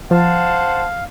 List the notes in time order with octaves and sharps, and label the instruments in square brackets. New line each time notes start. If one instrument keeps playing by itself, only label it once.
[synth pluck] F3 [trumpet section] C5 F#5 A5 [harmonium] F5